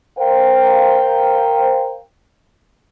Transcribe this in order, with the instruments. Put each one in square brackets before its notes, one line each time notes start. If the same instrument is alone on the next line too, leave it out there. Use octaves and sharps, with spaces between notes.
[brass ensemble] A#4 C5 F5 G5